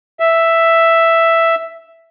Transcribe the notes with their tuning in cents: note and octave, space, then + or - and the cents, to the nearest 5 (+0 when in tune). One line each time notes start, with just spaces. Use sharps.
E5 +5